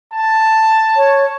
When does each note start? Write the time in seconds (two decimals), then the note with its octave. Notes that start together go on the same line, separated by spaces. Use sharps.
0.13 A5
0.97 C#5